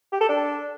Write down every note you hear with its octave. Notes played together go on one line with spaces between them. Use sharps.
G4
A4
D4